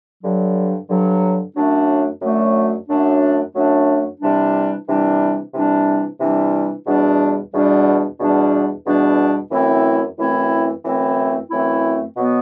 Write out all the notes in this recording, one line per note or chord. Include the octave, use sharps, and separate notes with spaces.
G2 D3 F#3
G2 D3 F#3
F#2 F#3 A3 D4
F#2 F#3 A3 D4
F#2 F#3 A3 D4
F#2 F#3 A3 D4
C3 E3 G3 D4
C3 E3 G3 D4
C3 E3 G3 D4
C3 E3 G3 D4
E2 B2 G3 D4
E2 B2 G3 D4
E2 B2 G3 D4
E2 B2 G3 D4
F#2 E3 A3 C4 E4
F#2 E3 A3 C4 E4
F#2 E3 A3 C4 E4
F#2 E3 A3 C4 E4
B2 F#3 B3